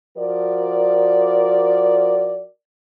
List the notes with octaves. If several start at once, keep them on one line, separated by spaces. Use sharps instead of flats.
F3 F#4 A#4 D5